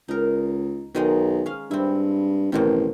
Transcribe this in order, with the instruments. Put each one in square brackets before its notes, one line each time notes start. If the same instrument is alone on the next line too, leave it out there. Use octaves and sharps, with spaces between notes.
[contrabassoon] C#2 [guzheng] D#4 A#4
[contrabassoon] B1 [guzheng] D#3 G#3 D#4
[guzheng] C#4 F5
[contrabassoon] G2 [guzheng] C4 E4
[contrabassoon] A1 [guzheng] F2 B2 D#3